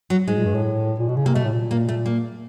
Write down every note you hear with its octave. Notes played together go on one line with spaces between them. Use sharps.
F#3
G#2 G#3
A#2
G2
A2
A#2
B2
C#3
C3 A#3
B2 A3
A2
A#2
A#3
A3
A#3